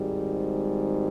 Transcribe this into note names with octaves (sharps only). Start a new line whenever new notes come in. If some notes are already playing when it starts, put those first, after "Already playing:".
Already playing: G#1 G#2 G3